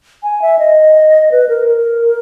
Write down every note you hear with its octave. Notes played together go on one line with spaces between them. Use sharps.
G#5
E5
D#5
B4
A#4
A#4